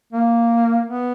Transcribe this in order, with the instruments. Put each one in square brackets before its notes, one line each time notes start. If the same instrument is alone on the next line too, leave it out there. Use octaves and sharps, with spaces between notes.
[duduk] A#3
B3